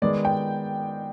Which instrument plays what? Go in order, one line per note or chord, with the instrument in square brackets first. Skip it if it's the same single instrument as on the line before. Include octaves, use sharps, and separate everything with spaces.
[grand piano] D#3 G#3 B3 [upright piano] D5
[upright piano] G5